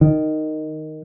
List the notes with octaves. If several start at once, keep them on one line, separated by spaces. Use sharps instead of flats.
D#3